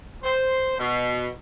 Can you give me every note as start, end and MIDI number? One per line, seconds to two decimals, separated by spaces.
0.24 0.78 72
0.78 1.29 47